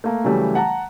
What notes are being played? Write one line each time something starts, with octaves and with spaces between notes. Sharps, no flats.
A3 A#3
C#3 E3 F#3 G3 A3
F#5 A5 A#5